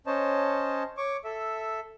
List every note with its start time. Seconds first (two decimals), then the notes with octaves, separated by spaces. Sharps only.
0.06 C#4 C5 C#5 D#5 A5
0.97 C#5 C#6 D6
1.24 A4 E5